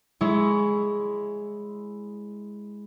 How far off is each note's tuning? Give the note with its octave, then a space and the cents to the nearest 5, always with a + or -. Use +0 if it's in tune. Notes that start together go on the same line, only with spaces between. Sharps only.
G#3 +0 E4 +0 C#5 +25